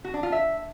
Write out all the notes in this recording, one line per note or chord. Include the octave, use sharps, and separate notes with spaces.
F#4
D4
F4
E5